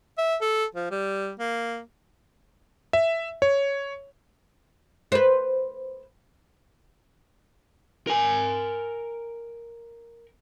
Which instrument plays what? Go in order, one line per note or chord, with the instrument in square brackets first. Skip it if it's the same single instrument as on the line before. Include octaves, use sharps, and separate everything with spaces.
[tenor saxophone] E5
A4
F3
G3
A#3
[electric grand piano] E5
C#5
[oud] B4 C5
[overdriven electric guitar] A#4 G#5